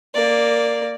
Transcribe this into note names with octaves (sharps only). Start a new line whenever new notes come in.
A#3 D5